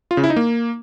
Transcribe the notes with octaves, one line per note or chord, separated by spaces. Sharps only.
F4
C#3
E4
D#4
A#3